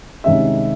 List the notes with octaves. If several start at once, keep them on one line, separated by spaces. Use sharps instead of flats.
C2 C3 D#3 G#3 C#4 E5